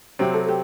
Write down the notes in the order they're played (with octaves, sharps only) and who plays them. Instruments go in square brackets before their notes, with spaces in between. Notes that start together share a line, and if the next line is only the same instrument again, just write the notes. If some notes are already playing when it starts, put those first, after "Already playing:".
[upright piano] C3 F#3 C4 [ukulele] G4
[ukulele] A4
G4